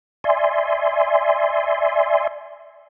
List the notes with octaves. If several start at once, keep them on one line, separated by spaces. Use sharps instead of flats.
D5 E5 G#5 C6